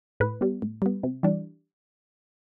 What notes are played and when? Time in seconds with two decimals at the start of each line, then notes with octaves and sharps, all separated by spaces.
0.20 A2 B4
0.41 G3 B3
0.62 A2
0.82 G3 B3
1.03 C3
1.23 E3 G3 D4